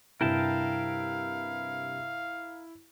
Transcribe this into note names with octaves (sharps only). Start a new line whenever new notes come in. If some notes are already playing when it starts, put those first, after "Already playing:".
G2 C3 E4 A#4 F5 G5 A5